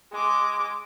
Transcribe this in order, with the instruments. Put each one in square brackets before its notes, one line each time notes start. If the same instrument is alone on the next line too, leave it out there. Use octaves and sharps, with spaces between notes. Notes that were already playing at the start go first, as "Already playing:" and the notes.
[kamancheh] G#3 D6